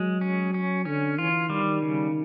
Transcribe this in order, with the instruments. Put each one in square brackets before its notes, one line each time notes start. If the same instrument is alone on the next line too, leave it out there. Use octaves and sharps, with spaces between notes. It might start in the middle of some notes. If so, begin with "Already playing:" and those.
Already playing: [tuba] F#3 [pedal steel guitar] G#3
[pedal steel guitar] C#4
C#4
[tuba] D3 [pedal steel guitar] C#4
[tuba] E3 [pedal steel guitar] F4
[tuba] D#3 [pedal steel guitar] G3
[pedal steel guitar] C#3